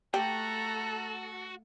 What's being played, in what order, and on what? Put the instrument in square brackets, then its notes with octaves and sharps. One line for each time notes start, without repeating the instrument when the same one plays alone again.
[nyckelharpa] A3 A#5 [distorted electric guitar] F#4 [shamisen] G4 [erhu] A4